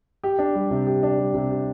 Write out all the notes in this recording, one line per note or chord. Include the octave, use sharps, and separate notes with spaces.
G4
D4
G3
C3
G4
D4
G3
C3
G4